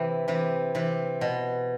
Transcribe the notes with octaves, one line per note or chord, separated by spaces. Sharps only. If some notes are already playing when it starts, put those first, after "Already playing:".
Already playing: C3 E3
C3 E3
C3 E3
B2